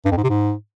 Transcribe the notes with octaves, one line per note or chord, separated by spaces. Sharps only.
G2
F2
G#2
C3
G#2